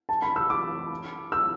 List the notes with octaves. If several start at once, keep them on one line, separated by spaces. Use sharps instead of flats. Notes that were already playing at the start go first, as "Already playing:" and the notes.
A5
B5
E6
D6
E6